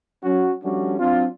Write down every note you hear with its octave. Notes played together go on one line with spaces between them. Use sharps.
F#3 C#4 F#4
F3 G3 A3 C#4 D4 F#4
F#3 C4 D4 F4